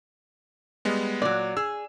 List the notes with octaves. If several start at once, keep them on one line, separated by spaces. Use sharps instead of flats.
G3 G#3 B3
A#2 F#3 D5
G#4 E6